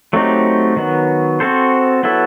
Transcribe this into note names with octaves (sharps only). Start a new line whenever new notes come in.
F#3 A3 C4 D#4 G4
D#3 F#3 B3
C4 F#4 A4 C5
F#3 B3 E4 A4